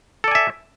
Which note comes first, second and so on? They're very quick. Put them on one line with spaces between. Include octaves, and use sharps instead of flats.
A4 D5 G#5 E5